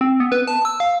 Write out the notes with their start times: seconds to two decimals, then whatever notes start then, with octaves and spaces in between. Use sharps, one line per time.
0.01 C4
0.20 B3
0.32 B4
0.47 A5
0.65 E6
0.80 F5